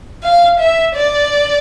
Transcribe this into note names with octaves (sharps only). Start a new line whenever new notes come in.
F5
E5
D5